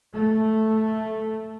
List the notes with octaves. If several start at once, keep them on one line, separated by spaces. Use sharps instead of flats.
A3